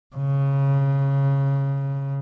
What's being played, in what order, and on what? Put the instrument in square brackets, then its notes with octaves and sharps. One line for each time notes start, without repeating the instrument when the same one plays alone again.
[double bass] C#3